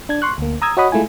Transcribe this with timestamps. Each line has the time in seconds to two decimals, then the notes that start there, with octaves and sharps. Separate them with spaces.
0.09 D4 G#6
0.22 C6 C#6 F#6
0.38 D2 A#3
0.62 A#5 D#6 E6 G#6
0.77 F#4 C#5 D#5 F#5 B5 D#6
0.92 G#3 A3 E4 F4 G#5